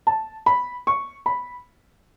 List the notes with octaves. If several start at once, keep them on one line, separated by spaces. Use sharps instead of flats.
A5
B5
C#6
B5